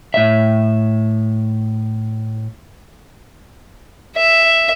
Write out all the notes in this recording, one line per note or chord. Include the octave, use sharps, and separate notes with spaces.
A2 E5
E5